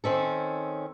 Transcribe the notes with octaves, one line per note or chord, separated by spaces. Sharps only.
D#3 C4 C#4 A4